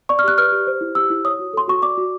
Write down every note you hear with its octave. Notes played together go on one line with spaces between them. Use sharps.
D5 C#6
F6
G4 F#6
B4 F6
G4
C5
E4
G4 E6
E4
C#5 D#6
F#4
A4 C6
F#4 C#6
D5 D6
F#4